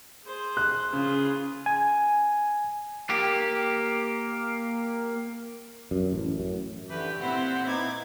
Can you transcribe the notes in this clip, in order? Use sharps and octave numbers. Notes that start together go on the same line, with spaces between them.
G#4 C5
F#6
C#3 F4 G#4
G#5
A#3 G4
F#2
A1
F#2
D3 E3 A3 G4 B4
A#2 C4 E4 C5 F#5 B5
B3 D#4 E4 D6 G#6